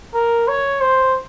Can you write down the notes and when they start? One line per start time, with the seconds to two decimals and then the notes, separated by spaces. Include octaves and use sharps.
0.14 A#4
0.48 C#5
0.81 C5